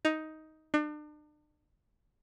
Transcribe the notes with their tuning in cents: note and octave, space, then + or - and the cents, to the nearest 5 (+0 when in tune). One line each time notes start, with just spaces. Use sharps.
D#4 +10
D4 +40